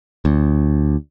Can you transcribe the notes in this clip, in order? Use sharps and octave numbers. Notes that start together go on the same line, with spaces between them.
D2